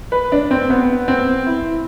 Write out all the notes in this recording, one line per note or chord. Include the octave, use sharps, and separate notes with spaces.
B4
D4
C4
B3
C4
E4